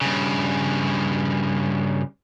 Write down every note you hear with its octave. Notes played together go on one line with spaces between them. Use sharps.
G2 C#3